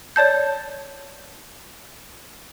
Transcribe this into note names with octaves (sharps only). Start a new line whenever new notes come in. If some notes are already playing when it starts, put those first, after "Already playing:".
C#5 D5 A5 G6